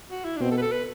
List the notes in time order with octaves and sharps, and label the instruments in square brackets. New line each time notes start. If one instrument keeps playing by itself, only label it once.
[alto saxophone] F#4
E4
D4
[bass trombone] B2 [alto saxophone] C4
[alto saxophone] A4
B4
A4
B4